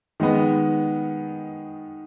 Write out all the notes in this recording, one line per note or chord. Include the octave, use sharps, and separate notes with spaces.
D#3 G#3 B3